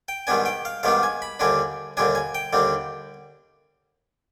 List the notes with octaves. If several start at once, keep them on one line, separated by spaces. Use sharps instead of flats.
G5
G#2 D#3 G3 B3 D4 G#5
G5
F5
G#2 D#3 G3 B3 D4 F5
G#5
B5
D#2 D3 G3 D4 G#5
D#2 D3 G3 D4 G#5
G#5
G5
D#2 D3 G3 D4